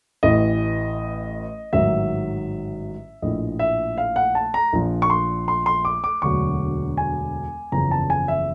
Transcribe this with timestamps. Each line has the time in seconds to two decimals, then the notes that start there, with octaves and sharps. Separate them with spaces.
0.23 A1 A2 E3 D#5
1.73 A1 G#2 D#3 F#3 E5
3.22 A#1 A2 F3 D#5
3.59 E5
3.98 F5
4.16 F#5
4.35 A5
4.54 A#5
4.73 A#1 A#2 F3
5.02 C#6
5.10 C6
5.48 C6
5.66 C6
5.85 D6
6.04 D6
6.22 E1 D2 D3 F#3 C#6
6.98 G#5
7.72 F#1 E2 C#3 F3 A#5
7.91 A5
8.10 G#5
8.28 E5